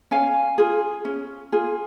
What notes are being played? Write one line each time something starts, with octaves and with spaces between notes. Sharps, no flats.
C#4 F5 G#5
F4 G#4
C#4
F4 G#4